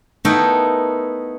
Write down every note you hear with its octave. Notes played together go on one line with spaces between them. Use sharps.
A3 B3 D#4 E4 A#4 G5